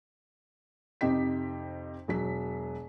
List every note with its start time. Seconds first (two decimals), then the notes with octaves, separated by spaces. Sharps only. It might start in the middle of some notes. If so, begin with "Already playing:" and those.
1.01 F2 C3 D#4 G4 B6
2.08 E1 F#3 B6